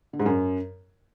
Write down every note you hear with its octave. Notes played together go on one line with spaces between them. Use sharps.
D3
G#2
F#2